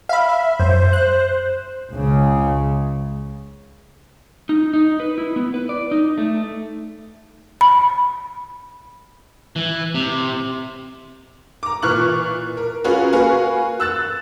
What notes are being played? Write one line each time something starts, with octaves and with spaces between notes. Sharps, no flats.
E5 F5 B5
E5
F#2 C5
F#6
C#2 C#3
D#4
D#4
B4
E4
B3
B4
D5
D#4
A3
B5
E3
C3
A#5 D6
A#2 E3 C#6 F6 F#6 F#7
A#4
C#4 F4 F#4 G#4 A#4 B4
A#3 F#4 B4 F5 G#5
E6 F#6 A6 E7